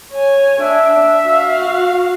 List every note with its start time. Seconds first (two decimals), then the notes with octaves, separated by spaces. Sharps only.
0.11 C#5 G#5
0.61 D4 E5
1.27 F#4 F5